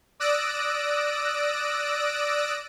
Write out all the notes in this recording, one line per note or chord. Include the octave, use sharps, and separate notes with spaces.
D5 D#6 E6 F#6 A#6 D7